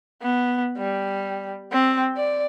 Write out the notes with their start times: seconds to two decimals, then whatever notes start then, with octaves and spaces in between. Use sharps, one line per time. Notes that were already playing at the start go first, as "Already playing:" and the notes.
0.22 B3
0.77 G3
1.72 C4
2.17 D5